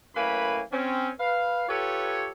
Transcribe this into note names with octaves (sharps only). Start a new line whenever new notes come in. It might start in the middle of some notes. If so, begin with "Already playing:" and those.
F#2 A2 A#3 B4 G#5 B5
C4 C#4
B4 F5
F4 G4 A4 B4 C#5